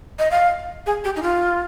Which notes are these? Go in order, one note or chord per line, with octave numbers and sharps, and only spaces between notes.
D#5
F5
G#4
G4
D#4
F4